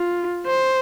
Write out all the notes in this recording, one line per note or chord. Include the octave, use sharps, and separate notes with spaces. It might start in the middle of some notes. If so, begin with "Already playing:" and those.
Already playing: F4
C5